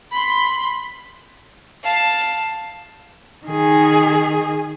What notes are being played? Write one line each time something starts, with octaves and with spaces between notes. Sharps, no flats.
B5 C6
F5 A5
D#3 G#4